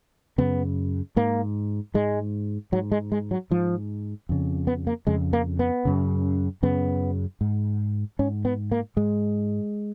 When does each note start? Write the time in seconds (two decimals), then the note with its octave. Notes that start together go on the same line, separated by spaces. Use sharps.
0.38 F#2 C#3 B3
1.16 G#2 A#3
1.94 G#2 G#3
2.72 G#2 F#3
2.92 G#3
3.12 G#3
3.31 F#3
3.51 G#2 F3
4.29 F2 C#3
4.67 B3
4.87 A#3
5.07 F2 C#3 G#3
5.33 A#3
5.59 B3
5.85 F#2 C#3
6.63 F#2 C#3 B3
7.41 G#2
8.19 G#2 C#4
8.45 B3
8.72 A#3
8.96 G#2 G#3